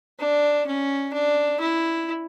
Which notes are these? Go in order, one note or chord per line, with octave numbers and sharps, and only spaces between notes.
D4
C#4
D4
E4